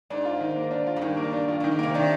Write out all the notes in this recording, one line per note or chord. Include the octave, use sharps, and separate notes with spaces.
G#2 D4
F4
D#3
A#3
D4
F4
G#2
G2 D#3
A#3
D4
G2 F4
G2 D#3
G#2
C3 A#3
C3 D#3 D4